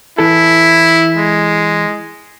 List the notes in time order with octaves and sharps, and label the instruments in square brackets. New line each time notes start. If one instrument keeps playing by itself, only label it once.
[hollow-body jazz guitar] E3 A4 [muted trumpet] E4
[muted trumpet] G#3